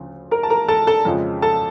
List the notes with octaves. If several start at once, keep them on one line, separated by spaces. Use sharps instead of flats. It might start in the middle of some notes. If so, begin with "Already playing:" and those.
Already playing: D2 C#3 F3
A#4 A#5
A5
A#4 A#5
A4 A5
A4 A5
F2 C#3 F3 G#3
A4 A5